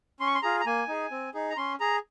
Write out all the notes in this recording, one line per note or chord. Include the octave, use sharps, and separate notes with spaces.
C#4 C6
C#6
C6
F4 G#4 A#5
A#5
A#3 G#5
D#4 G#4
C4
D#4 G#4
A#5
C#4 C6
G#4 A#5